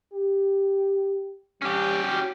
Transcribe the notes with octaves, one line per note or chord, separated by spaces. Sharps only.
G4
G3 C#4 G4
F#4